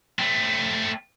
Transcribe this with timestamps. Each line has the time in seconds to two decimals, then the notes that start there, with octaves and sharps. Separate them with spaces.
0.19 A3 C4